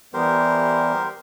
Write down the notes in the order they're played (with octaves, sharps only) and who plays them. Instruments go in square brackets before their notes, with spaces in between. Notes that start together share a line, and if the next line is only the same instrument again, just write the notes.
[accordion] E3 G3 B3 [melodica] G4 A#4 C5